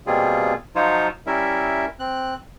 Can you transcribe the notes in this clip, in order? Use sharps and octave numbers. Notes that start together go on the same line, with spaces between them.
B2 G3 A#3 C4 F4 G#4
F3 F#3 D#4 F4 C5 C#5
G3 C#4 E4 A#4 E5
C4 F#6